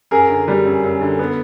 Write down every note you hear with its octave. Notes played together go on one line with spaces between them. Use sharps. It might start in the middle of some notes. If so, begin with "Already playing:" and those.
F#2 G#4 A#4
D3
G3
F#2
F#2
D3
B3